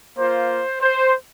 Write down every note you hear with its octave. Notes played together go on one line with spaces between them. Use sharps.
A#3 F4 C5
C5